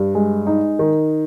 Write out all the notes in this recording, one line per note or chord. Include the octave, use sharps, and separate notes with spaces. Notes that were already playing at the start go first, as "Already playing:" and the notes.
Already playing: G2
G#3
D#4
D#3